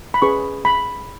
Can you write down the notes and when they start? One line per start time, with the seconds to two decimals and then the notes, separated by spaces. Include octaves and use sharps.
0.14 B5
0.22 C#4 G#4 B4 C#6
0.65 B5